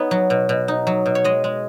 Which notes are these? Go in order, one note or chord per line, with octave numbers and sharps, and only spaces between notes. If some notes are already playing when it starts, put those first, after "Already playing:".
Already playing: B3 D#4 B4 C#5
F#3
B2
B2
D#4
F#3
B2
C#5
G#3 D#5
G#3